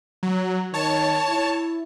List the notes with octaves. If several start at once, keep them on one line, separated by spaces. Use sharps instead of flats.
F#3
D#3 C#5 A5
E4